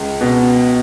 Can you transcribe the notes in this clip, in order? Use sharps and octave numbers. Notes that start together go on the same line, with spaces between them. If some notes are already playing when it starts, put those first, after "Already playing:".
Already playing: C#2
B2